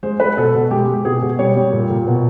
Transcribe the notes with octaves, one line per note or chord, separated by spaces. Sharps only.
G#3 C5
G#3 B4
B2 A4
B2
G#3 G4
G#3
B2 G#4
B2
G3 C#5
G3
A#2
A#2
B2